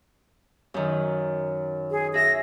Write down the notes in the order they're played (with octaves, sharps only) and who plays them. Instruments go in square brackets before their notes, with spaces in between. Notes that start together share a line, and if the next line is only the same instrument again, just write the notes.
[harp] F#2 D#3
[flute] G#4
[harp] G#4 E5 [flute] A#6